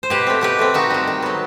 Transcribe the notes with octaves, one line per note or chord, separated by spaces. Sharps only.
C5
B2 G4 B4
A3 C4
B2 G4 B4
A3 C4
D#3 D#4 F#4
G3 C4
D#3
F#3 B3